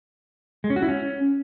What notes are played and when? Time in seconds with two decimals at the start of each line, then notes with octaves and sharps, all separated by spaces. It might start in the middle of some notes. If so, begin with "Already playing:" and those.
0.64 G#3
0.70 C#4
0.76 F#4
0.82 E4
0.88 C#4